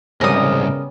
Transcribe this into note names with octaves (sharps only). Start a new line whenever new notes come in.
C2 G#2 C#3 G3 B3 C#4 A#4 D#6